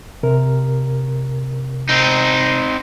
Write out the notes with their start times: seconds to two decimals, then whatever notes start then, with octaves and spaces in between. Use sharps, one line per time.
0.23 C3 A#4
1.89 C4 D#4